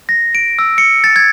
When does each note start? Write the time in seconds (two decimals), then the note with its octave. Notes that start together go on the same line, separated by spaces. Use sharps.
0.09 A#6
0.35 D7
0.59 E6
0.78 C#7
1.04 A6
1.16 G#6